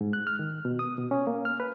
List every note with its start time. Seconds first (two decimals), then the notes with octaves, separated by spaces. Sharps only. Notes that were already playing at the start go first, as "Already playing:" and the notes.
0.01 G#2
0.13 F#6
0.27 F6
0.39 D#3
0.65 B2
0.79 D#6
0.98 B2
1.11 C#4
1.27 A#3
1.45 F6
1.60 B4